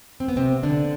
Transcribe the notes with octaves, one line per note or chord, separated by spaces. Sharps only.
C4
B3
C3 C4
D3 D4